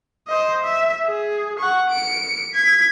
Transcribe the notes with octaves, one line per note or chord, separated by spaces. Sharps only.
C5 D#5
E5
G#4
F#5 C#6
C#7 D7
G#6 B6